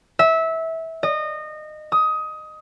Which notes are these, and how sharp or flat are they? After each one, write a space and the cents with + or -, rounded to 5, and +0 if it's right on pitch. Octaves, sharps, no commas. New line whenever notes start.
E5 -20
D#5 -25
D#6 +20